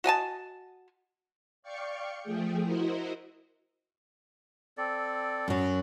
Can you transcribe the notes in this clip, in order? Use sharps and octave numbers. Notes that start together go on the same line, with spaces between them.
F#4 D#5 G#5 A5
D5 F5 G5 C#6 C#7
F3 A3 G#4 G5
E4 F#4 A#4 C5 D#5
C4 A4 D5
F#2 F#3